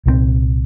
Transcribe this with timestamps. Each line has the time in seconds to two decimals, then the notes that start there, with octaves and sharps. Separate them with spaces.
0.06 C2 A#2 F3 C4